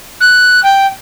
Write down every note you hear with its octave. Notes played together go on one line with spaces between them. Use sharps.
F#6
G5